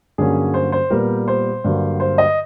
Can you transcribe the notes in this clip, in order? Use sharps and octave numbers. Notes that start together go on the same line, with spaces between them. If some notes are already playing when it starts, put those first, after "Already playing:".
G2 D3 F#3 A#3 C#4 G#4
C5
C5
A#2 G3 B3 A#4
C5
G2 D3 F#3 A#3
C5
D#5